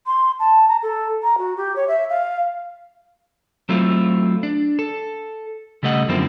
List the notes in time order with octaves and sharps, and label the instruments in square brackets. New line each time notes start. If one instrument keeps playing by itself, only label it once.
[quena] C6
A5
A#5
A4
A#5
F#4
G4
C#5
E5
F5
[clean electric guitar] F#3 A3 C4 E4 F4
D4
A4
C#3 G3 A3 D#5 F#5
F#2 D3 F3 A#3 C4 E4